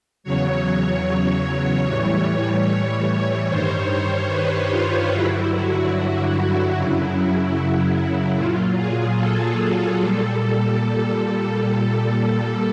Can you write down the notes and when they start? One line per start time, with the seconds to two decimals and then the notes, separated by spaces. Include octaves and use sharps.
0.24 E2 C#3 F#3 C#5
1.86 A2 E3 G3
3.48 G2 D#3 G3 C5
4.30 B4
4.70 F4
5.11 G2 D3 F#3 E4
5.52 F#4
5.92 E4
6.74 F#2 C#3 F#3 E4
8.36 A#2 F#3 F4
8.78 G#4
9.18 A4
9.99 A#2 G3
11.62 A#2 G3